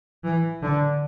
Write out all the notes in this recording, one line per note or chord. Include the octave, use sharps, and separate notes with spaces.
E3
D3